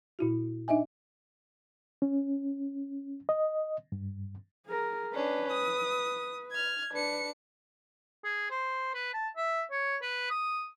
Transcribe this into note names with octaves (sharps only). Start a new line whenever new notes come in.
A#2 E4 F#4
D4 D#4 D#5 E5 G#5
C#4
D#5
G2
G#4 A#4
C#4 D4 B4
D#6
F6 G#6
D4 B4 C#7
G#4
C5
B4
A5
E5
C#5
B4
D#6